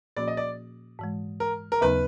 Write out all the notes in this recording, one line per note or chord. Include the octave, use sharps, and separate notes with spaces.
A#2 F3 A#3 C#4 F#4 D5
D#5
D5
G#2 E3 G#3
A#4
A#4
D#2 C#3 F#3 B3 D#4 B4